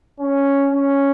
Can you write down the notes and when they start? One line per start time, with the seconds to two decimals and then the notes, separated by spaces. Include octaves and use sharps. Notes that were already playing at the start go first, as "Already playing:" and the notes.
0.19 C#4
0.72 C#4